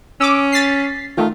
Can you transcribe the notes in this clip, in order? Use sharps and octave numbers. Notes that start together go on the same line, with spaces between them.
C#4 D6 E6
A6 B6 C7
D#3 A3 F4